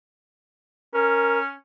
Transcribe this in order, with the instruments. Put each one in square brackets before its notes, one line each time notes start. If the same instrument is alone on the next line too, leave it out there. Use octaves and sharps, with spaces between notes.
[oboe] C#4 [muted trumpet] A#4